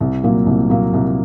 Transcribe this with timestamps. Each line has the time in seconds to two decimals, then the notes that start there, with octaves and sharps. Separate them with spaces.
0.01 C2
0.23 A#2 F#3 A#3
0.46 C2
0.70 A#2 F#3 A#3
0.93 C2